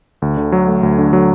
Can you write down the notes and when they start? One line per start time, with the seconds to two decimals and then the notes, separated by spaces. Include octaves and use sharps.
0.22 D2
0.37 D3
0.52 F#3
0.68 A3
0.83 D2
0.99 D3
1.13 F#3